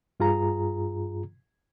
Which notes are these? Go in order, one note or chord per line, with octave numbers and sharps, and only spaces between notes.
G2 F4 G#4 A#5